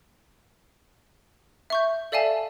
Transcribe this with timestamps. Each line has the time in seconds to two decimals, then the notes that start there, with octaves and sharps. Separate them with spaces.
1.70 E5 C#6 G6
2.12 A4 D5 E5 F5 G#5 A5